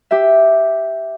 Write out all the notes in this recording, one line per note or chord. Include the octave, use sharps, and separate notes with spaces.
G4 E5